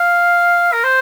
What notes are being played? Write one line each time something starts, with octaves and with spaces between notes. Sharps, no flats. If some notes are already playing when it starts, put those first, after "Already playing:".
Already playing: F5
A#4
C5